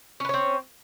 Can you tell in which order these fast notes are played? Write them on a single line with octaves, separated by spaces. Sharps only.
C#4 B4 C#5 C4